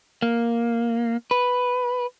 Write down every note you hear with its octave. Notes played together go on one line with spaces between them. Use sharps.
A#3
B4